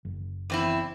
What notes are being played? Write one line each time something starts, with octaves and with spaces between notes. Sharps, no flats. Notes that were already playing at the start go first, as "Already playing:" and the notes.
F#1
E2 C4 E4